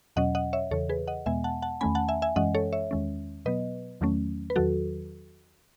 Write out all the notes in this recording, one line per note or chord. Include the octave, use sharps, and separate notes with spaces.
E2 B2 F#3 C#4 D#5 F#5
D#5 F#5
C#5 E5
E2 C#3 E3 A4 C#5
G#4 B4
D#5 F#5
E2 B2 G#3 B3 E5 G#5
F#5 A5
F#5 A5
E2 D#3 A3 C#4 G#5 B5
F#5 A5
E5 G#5
E5 G#5
F#2 E3 G#3 C#4 D#5 F#5
A4 C#5
C#5 E5
E2 D#3 G#3 C#4
B2 F#3 B3 B4 D#5
E2 D#3 F#3 A3 C#4
B4
E2 D#3 F#3 F#4 A4